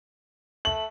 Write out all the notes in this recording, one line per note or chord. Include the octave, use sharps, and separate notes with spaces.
A3 F#7